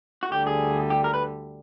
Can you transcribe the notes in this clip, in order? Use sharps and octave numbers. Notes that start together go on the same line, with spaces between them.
F#4
D2 D3 G3 G4
G#4
G4
A#4
B4